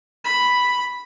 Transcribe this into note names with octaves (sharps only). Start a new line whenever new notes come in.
B5